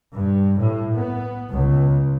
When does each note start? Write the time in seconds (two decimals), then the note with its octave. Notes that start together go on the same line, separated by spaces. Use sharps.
0.14 G2
0.60 A2
0.93 B3
1.53 C#2